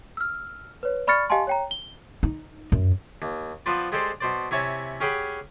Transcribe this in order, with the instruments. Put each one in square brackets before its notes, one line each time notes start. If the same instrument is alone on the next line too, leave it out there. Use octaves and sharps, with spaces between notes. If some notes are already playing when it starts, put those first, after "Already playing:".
[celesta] E6 F6
B4 C#5
D5 B5 C#6 F6 A6 C#7
G4 D#5 F5 G#5 A5 C6
C#5 G5 A#5
G7
[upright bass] D#4
F#2
[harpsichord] D#2
F3 B3 B4 C5 D5
G#3 G4 A4 C5 D5
B2 C5 D5
C3 E4 C#5 G#5 A5
C#4 G4 G#4 F#5 G5 B5